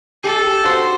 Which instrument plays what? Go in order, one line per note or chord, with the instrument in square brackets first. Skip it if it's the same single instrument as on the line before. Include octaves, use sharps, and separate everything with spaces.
[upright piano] G4 [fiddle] A4
[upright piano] F#4 [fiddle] C5